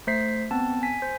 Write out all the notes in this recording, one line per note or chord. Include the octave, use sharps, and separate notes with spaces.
A3 C5 B6 C7
B3 C4 A5
G#5 B6
C5